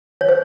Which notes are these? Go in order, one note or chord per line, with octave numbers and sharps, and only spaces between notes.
C#5
C5